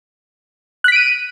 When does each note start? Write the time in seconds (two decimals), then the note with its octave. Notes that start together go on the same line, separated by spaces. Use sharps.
0.84 F#6
0.88 B6
0.92 D7
0.96 D#7